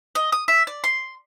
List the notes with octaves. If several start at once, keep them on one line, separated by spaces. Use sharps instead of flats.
D#5
D#6
E5
D5
C6